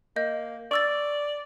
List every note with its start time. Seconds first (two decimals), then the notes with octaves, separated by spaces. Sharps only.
0.16 A#3 D#5 G6
0.71 D5 C#6 E6 A6